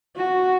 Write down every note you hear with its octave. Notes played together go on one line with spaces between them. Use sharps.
F#4